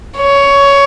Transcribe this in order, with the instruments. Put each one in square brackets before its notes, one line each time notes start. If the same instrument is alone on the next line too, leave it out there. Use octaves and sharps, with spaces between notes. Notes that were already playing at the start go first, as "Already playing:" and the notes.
[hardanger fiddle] C#5